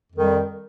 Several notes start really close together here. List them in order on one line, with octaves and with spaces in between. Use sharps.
F2 D#3 G3